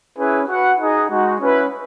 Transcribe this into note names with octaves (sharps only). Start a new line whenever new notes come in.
C#4 E4 G#4 B4
F#4 B4 F#5
D#4 G#4 D#5
G#3 D#4 F#4
C#4 E4 B4